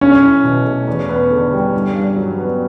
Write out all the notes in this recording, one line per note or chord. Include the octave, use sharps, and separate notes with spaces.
B1 C#4
E4
B2
A3
E2
B3
D3
G3
G2
G2
F#3
B3